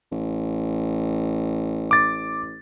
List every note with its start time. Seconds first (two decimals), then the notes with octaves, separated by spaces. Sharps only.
0.12 A1
1.91 D6 A6